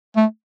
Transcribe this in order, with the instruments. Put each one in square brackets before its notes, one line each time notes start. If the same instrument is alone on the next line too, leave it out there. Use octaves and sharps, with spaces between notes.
[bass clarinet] A3